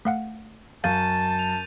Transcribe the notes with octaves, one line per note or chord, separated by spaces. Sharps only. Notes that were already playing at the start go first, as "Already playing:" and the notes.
A3 F5 F#5
F#2 F5 A5 G6 A6 D#7
F7